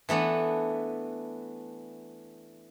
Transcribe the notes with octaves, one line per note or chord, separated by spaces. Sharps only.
E3 A3 B3 D4